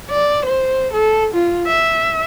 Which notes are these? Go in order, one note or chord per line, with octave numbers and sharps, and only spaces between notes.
D5
C5
A4
F4
E5